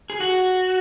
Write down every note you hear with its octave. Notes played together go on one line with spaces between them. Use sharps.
G#4
F#4